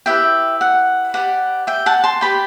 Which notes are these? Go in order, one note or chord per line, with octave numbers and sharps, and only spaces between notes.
E4 G4 B4 E5 G5
F#5
G4 B4 D5 F#5
E5 G5
F#5 A5
A5 C6
G4 B4 D5 G5 B5